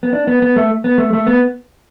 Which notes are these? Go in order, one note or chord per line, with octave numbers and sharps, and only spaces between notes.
B3
D4
B3
B3
A3
B3
A3
A3
B3